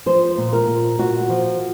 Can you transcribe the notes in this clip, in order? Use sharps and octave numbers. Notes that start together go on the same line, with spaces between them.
F3 C5
A#2
A#4
A#2
A#2 F#4
F3